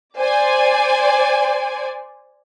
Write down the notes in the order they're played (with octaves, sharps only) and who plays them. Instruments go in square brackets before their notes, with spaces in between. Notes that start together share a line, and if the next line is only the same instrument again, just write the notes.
[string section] C5 D5 G#5